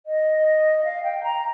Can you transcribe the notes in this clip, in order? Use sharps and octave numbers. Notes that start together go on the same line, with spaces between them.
D#5
F5
G5
A#5